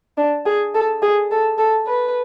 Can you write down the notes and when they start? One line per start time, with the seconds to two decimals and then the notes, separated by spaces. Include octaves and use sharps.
0.17 D4
0.45 G#4
0.74 A4
1.02 G#4
1.31 A4
1.58 A4
1.87 B4